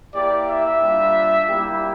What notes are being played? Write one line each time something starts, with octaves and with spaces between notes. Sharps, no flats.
A#3 E4 G4 D5
E5
G3 A#3 D4 F4
G3 A#3 E4 G4